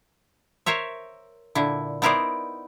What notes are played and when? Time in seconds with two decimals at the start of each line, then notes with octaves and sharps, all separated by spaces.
0.66 A#4 C5 C#5 E5
1.55 A#2 D3 E4
2.02 B3 D#4 E4 A#4 C5 D5